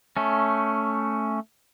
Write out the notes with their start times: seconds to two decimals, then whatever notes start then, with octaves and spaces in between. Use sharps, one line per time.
0.17 A3 C#4